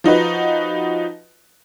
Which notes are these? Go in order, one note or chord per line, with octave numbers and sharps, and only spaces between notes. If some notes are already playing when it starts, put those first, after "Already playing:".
F3 D#4 F#4 B4